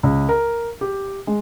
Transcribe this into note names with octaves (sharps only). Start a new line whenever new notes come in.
C#2
A#4
G4
G#3